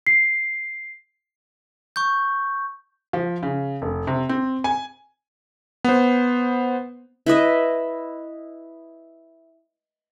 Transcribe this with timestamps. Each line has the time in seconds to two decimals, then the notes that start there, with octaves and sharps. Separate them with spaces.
0.07 C7
1.96 C#6 G6
3.13 F3
3.43 C#3
3.82 F1
4.07 C3
4.29 C4
4.64 G#5
5.84 B3 C5
7.26 E4 B4 D#5 E5